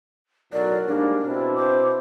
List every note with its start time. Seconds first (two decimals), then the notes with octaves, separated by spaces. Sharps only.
0.53 B1 A2 F#3 A#4 D5
0.88 G#2 G3 A#3 D4
1.25 B2 C4 E4
1.56 C5 D6